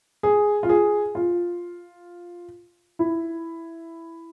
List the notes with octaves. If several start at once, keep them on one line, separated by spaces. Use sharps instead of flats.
G#4
F4
G#4
F4
E4